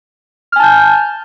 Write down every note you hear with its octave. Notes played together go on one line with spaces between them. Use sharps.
G#5 A5 F6 G6